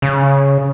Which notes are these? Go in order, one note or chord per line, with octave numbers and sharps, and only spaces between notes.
C#3